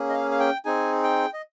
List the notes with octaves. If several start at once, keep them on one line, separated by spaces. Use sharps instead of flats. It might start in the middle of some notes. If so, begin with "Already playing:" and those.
Already playing: A#3 C#4 G#4
D#5
F5
F5
G5
C4 D#4 G#4 G#5
G5
D#5